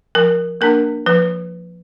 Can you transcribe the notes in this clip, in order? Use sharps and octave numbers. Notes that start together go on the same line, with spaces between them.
F3 A#4
A#3 D4 A#4
F3 B4